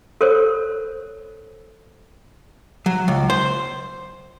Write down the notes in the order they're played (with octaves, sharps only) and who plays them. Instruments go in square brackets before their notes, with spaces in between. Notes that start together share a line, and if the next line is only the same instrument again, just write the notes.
[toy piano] A4 A#4 C5 C#5
[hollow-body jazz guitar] F#3
C#2
C5